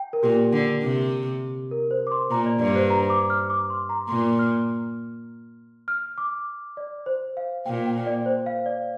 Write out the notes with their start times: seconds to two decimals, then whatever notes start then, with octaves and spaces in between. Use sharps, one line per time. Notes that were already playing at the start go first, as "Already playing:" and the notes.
Already playing: G5
0.13 A#4
0.23 A#2 G4
0.53 D3
0.83 C3
1.71 A#4
1.91 C5
2.07 D6
2.12 C6
2.31 A#2 A#5
2.46 D5
2.60 G2 D5
2.75 C5
2.90 A#5
3.10 D6
3.30 F6
3.50 D6
3.70 C6
3.89 A#5
4.09 A#2 C6
4.39 F6
5.88 F6
6.18 D6
6.77 D5
7.06 C5
7.37 F5
7.66 A#2 G5
7.86 G5
8.07 D5
8.26 C5
8.46 F5
8.66 D5